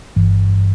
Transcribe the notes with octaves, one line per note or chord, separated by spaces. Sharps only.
G1 G2 E3